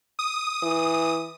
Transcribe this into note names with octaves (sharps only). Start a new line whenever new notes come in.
D#6
E3